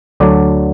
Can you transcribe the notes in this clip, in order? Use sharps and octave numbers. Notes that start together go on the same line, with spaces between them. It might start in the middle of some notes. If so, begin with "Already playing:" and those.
D2 D3 F#3 D4 D5